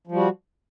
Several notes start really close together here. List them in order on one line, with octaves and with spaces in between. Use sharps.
F3 G3 F#4